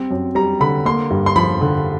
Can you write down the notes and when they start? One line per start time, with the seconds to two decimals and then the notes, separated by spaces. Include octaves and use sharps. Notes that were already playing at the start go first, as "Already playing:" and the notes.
Already playing: G3 C4
0.10 F#2
0.35 G3 A#5
0.60 D3 B5
0.85 A#3 C6
1.11 G2
1.26 C6
1.36 F3 B5
1.61 D3